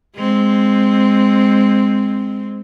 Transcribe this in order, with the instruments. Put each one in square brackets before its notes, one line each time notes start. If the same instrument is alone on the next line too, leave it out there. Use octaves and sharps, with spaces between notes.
[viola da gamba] G#3 C4